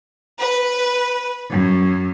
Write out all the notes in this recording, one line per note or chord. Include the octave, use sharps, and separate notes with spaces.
B4
F#2